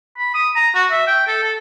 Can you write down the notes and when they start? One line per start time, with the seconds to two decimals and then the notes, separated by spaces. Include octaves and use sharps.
0.18 B5
0.34 D#6
0.55 A#5
0.75 F#4
0.91 E5
1.07 G5
1.27 A4
1.43 A4